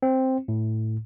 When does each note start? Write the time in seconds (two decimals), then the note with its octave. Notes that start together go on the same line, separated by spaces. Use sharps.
0.03 C4
0.48 A2